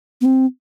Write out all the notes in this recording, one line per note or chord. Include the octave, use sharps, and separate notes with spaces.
B3
C4